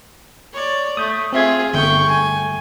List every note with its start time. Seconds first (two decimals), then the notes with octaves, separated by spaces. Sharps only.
0.53 C#5 D5
0.97 A3 D#6 G6
1.33 C4 F4 G#4 E5 G#6
1.73 G1 A3 G5 C#6
2.09 G#5